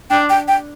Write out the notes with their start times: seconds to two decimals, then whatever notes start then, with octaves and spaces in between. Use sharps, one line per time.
0.10 D4 G5
0.30 G5
0.48 G5